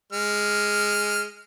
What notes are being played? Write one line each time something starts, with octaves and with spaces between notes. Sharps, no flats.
G#3 F6